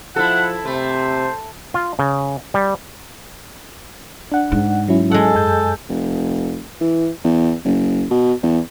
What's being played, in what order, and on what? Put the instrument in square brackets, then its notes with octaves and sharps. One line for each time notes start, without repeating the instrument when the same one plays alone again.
[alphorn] F3 [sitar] E4 A4 [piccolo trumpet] F#5
[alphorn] C3 [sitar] A3 [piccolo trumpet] C5
[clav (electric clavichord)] F4
C#3
G3
[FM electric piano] D4 F#5
[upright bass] G#2
[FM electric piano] F#3 C#4 E4
[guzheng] G#3 F#5 [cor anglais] A4
[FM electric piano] F#2 G#5 G6
[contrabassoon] F1
E3
E2
F#1
B2
E2